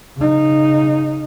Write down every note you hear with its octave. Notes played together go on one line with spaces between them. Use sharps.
C#3 D#4